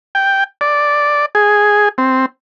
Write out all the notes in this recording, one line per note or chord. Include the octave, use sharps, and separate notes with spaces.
G5
D5
G#4
C4